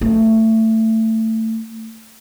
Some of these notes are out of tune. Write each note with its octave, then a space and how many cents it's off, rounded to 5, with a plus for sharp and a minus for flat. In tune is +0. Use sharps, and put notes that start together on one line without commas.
A3 +20